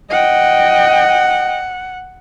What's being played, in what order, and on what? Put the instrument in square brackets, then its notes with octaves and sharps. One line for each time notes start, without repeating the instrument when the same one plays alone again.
[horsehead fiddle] D#5 G5 [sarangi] F#5